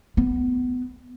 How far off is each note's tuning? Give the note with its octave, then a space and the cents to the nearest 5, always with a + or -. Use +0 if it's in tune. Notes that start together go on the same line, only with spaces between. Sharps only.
B3 +20